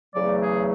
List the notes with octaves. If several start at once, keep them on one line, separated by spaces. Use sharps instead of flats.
E2 C#3 F#3 A3 D5
G#4